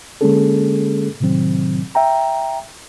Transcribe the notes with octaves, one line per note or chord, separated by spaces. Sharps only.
D3 G#3 A#3 C#4 G#4 A4
A2 C3 D#3 F#3 C4
E5 G5 A#5